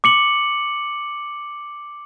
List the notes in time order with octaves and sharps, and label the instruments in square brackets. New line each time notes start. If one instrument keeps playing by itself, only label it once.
[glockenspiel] D6 C#7 F#7